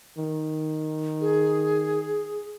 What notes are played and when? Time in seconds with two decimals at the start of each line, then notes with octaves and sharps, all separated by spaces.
0.18 D#3
1.21 G#4